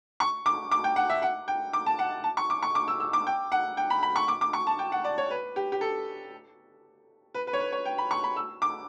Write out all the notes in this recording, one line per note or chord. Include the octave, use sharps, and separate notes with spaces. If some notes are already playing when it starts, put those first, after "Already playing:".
C#6
D6
D6
G5
F#5
E5
F#5
G5
D6
A5
F#5
A5
C#6
D6
C#6
D6
E6
E6
D6
G5
F#5
G5
B5
B5
C#6
D6
D6
C#6
A5
G5
F#5
D5
C#5
B4
G4
G4
A4
B4
B4
C#5
B4
C#5
G5
B5
C#6
B5
E6
D6